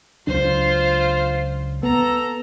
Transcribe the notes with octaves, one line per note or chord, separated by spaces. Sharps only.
C#2 F#3 D4 F4 C5
B3 A4 A#5